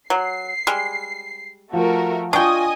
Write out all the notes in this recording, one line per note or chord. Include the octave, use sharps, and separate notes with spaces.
F#3 C7
G3 G#3
F3 A3 F#4 A#4
D4 F4 D#5 G5 G#5 C#6 D#6